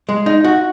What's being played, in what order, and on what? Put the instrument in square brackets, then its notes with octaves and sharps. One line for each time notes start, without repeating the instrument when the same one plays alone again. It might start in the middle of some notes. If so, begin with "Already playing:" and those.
[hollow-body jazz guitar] G#3
D#4
F#4